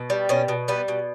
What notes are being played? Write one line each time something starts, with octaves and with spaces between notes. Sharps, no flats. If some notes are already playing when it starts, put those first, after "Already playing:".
Already playing: B2
G3
B2 C#4
B2
G3 B3
B2